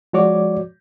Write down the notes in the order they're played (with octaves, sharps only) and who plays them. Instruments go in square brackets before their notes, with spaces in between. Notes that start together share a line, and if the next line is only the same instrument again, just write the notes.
[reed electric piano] F3 G#3 F#4 C#5 D5 D6